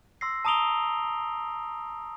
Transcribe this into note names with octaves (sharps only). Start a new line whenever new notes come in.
C6 E6 A#6 C7
A5 A#5 D#6 D7 F7 G7